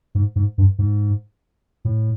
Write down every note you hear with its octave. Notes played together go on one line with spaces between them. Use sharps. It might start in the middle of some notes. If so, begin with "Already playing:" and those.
G#2
G#2
G2
G#2
A2